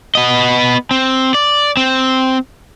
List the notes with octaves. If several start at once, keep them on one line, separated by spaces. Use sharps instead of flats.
B3 D#5
C4
D5
C4